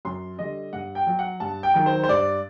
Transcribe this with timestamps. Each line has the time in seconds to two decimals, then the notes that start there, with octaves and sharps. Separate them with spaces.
0.05 F#2 C6
0.39 D3 G3 D#5
0.73 G2 F#5
0.95 G5
1.07 F#3
1.19 F#5
1.40 G2 A5
1.63 G5
1.74 D#3 F#3
1.86 C5
2.04 C5
2.08 G2 D5